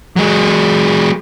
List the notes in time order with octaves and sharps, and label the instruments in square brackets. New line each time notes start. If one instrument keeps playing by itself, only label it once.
[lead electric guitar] F#3 G#3